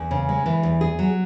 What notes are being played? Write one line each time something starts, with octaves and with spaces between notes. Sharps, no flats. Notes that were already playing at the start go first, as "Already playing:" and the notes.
Already playing: E2
C#3
G#3
E3
E2
G#4
F#3